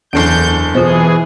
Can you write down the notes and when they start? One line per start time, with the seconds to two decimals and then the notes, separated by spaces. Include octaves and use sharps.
0.13 F#1 E2 D3 G6 C7 D7
0.75 B2 E3 F4 G#4 C5